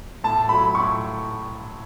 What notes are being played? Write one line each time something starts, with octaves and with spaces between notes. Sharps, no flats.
A2 A5
F#3 A3 B5
A2 C#6